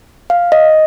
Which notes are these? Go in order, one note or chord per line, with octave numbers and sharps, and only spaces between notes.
F5
D#5